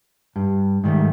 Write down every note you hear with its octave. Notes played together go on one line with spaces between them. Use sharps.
G2
G#2 D#3 G3 A3